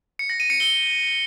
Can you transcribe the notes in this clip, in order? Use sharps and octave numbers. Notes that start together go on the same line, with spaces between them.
C#7
A#6
D#7
C#7
G7